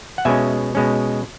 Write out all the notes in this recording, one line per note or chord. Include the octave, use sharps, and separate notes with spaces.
F#5
B2 G#3 C#4 E5 G#5
B2 G#3 C#4